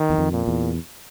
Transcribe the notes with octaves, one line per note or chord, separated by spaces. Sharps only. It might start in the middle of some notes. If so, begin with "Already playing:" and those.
Already playing: D#3
E2
F2
A#2
E2